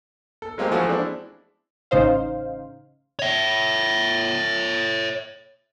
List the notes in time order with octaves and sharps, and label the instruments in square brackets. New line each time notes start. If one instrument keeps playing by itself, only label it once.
[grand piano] A4
F#3 G#3 A#3 C4 G4
E3 F3 A3 F#4
G#3 C4 D4 E4
[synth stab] A1 C#3 D#4 C5 F5
[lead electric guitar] C#5 E5